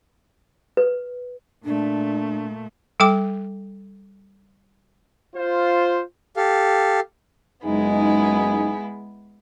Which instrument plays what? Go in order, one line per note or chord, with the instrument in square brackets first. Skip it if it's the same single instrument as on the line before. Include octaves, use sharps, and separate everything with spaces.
[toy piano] B4
[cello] A#2 A3 [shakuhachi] D4
[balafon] G3 A4 G5 D6
[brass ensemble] F4 C5
[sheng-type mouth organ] G4 A4 F5
[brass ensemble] F#1 F#2 D#4 [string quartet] G#3 B3 E4 [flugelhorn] G#4